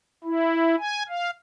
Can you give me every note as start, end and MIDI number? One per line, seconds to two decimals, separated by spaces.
0.24 0.76 64
0.79 1.03 80
1.09 1.30 77